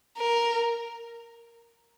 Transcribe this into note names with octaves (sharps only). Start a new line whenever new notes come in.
A#4